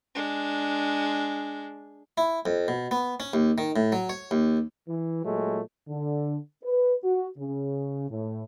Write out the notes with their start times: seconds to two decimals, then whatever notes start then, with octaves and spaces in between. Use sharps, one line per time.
0.15 G#3 D4
2.18 E4
2.46 F2
2.68 B2
2.91 B3
3.20 C#4
3.34 D#2
3.58 D#3
3.76 A2
3.92 F#3
4.09 C#5
4.31 D#2
4.88 E3
5.24 A#2 F#3 G#3 A3
5.89 D3
6.64 B4
7.04 F#4
7.38 C#3
8.10 A2